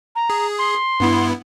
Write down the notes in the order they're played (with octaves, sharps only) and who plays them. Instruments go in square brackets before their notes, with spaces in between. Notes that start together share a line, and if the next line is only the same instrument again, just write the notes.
[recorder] A#5
[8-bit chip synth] G#4
[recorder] C6
[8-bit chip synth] G2 B3 E4